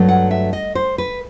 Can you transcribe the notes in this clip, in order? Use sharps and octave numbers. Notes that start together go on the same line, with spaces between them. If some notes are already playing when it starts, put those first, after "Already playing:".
Already playing: G2 F#3 A3
F#5
E5
D#5
C5
B4